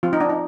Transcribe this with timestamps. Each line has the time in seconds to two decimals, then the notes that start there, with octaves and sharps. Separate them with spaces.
0.03 F3 C4 F4
0.13 D#4
0.20 D4
0.30 D#4